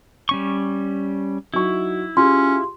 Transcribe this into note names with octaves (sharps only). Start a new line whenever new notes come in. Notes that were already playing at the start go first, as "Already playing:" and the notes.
G3 C#4 C#6
F#3 D#4 E4 C#6
C#4 F4 G4 G#4 C6